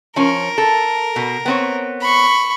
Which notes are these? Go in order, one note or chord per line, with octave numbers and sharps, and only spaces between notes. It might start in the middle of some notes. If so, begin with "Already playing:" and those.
F3 C#4 A#4
A4
B2
B3 C4 C#5
B5 C#6